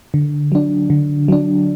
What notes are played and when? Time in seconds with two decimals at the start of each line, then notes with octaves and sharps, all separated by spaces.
0.14 D3
0.52 F#3 D4
0.90 D3
1.28 F#3 D4